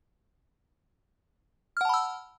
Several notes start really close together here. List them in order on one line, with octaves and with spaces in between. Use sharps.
F6 F#5 A5 B5 E6